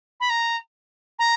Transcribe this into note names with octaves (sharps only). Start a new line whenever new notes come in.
B5
A#5
A#5